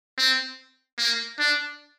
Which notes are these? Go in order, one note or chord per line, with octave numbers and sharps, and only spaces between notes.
C4
A#3
D4